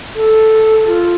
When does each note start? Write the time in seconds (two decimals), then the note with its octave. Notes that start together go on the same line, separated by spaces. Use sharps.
0.15 A4
0.87 F4